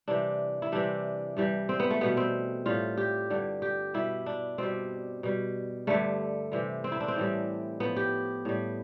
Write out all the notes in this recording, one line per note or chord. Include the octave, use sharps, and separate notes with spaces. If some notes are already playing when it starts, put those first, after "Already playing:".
C3 E3 G3 D4
E4
C3 E3 G3 D4
G2 E3 G3
C4
B3
A3
B2 G3 B3
C4
A2 G3 F4
G4
G2 D3 G3
G4
B2 G3 E4
D4
B2 G3 C4
B2 G3
G2 D3 G3 A3
C3 E3 G3
C4
E4
D4
C4
A2 E3 G3
A2 F3 B3
G4
A2 G3